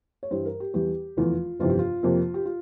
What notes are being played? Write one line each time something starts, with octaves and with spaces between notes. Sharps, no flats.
C#5
G2 E3 G3 C5
A#4
G4
E2 E3 G3 G4
F1 E2 E3 F4
G1 F2 C3 E3 F4
G4
F4
F2 C3 F3 A#3
G4
F4